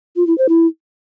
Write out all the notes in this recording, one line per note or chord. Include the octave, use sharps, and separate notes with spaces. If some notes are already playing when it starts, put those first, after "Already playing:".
F4
E4
C5
E4